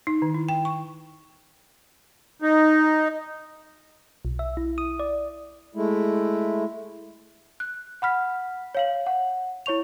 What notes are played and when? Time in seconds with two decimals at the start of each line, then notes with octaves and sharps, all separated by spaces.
0.07 D#4
0.22 D#3
0.34 E4
0.49 G5
0.65 C#6
2.42 D#4
4.25 B1
4.39 E5
4.57 E4
4.78 D#6
4.99 D5
5.75 G#3 A3 E4
7.60 F#6
8.02 F#5 B5 F6 B6
8.75 C#5 F5 F#7
9.07 F#5
9.66 E4 C#5 C#6 F7